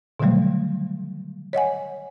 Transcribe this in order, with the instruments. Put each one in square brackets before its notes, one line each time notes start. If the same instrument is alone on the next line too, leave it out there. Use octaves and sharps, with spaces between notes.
[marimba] B2 D3 D#3 F#3 G3 A3
C#5 D#5 F#5 G#5